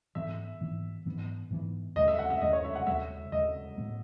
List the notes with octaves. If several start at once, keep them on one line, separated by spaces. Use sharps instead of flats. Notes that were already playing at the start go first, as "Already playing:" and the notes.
G#2 E3 B3 E5
G#2 E3 B3
G#2 E3 B3
G#2 E3 B3
D#2 C#3 G#3 D#5
E5
F#5
E5
D#2 C#3 G#3 D#5
C#5
E5
F#5
D#2 C#3 G#3 E5
D#2 C#3 G#3 D#5
A2 G#3 B3